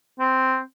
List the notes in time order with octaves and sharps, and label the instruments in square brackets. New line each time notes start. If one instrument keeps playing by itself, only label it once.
[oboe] C4